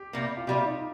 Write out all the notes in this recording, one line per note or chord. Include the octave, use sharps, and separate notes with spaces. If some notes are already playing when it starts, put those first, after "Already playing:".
Already playing: G4
C3 G3 A#3
F4
C3 G3 A#3 G4
D#4